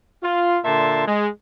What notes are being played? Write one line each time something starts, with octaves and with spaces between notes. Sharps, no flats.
F4
A#2 D3 E5 A5 C6
G#3